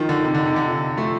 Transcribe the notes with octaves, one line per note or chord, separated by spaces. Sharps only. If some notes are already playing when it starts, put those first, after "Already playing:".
Already playing: D#3 F3 D#4
D3
C3
D3
C3
D3
F4
F3 A3